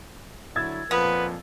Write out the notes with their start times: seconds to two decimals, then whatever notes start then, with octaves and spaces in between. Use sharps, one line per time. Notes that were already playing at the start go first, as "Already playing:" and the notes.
0.56 D3 F#3 E4 E6 G#6 A6
0.91 F2 A#2 F3 B3 B4